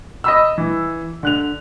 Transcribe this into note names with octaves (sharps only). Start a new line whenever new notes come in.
D#5 B5 E6
E3
D3 F#6 F7